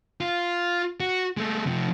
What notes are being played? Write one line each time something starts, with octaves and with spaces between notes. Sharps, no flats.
F4
F#4
G#3 A3
C3 F3